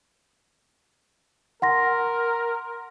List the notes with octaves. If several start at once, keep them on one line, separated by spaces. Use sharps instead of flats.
A#4 F#5 C6 A#6